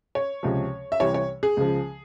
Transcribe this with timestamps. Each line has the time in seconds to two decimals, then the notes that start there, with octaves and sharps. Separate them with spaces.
0.15 C#5
0.43 C#2 C3 F3
0.92 E5
1.00 C2 C3 E3 C#5
1.14 C#5
1.43 G#4
1.57 C#2 C#3 F3